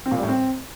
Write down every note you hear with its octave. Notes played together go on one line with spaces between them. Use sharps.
C4
A#2
G3
A2
C4